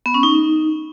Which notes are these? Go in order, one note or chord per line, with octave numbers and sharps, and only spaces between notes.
B3
C#4
D#4